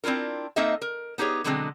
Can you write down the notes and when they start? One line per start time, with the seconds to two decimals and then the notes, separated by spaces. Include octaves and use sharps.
0.04 C4 D4 E4 F4 A#4
0.56 A#3 C4 D#4 A4 D#5 E5
0.82 A#4
1.18 B3 D#4 G4 G#4 C#5
1.44 B2 D3 F#3 G#3 A#3 C4